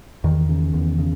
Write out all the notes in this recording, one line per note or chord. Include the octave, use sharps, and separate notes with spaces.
E2 D#3
C#3
E2
C#3